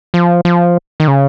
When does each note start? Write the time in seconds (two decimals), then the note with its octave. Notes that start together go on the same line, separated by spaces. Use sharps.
0.14 F3
0.45 F3
1.00 D#3
1.08 C#3